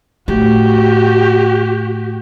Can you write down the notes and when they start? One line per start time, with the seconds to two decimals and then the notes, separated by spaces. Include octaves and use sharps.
0.28 A2 F#4 G4